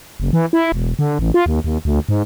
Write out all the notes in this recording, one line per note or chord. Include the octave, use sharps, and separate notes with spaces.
F#1
E3
E4
E1
D3
A1
F4
D#2
D#2
D2
G#2